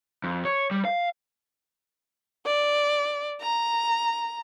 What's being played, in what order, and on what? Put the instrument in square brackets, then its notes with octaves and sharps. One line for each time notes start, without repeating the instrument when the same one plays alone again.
[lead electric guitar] F2
C#5
G3
F5
[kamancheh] D5
A#5